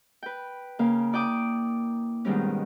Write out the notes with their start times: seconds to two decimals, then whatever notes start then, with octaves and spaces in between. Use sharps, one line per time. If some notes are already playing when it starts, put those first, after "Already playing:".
0.23 B4 G5
0.79 C#3 A#3 F5
1.13 E4 D5 G5 D6 D#6
2.25 G#2 B2 D#3 G3 C#4